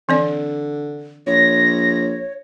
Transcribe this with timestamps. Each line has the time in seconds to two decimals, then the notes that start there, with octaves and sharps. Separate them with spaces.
0.09 D3 E3 C4 D5
1.27 A#1 C#5 A#6